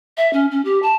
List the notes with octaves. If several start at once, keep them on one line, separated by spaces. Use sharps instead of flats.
E5
C#4
C#4
G4
A5